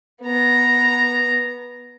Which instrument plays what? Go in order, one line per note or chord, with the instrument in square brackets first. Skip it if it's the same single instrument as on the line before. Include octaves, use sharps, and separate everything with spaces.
[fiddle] B3 A#5